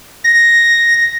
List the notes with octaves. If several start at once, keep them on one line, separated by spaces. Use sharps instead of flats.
A#6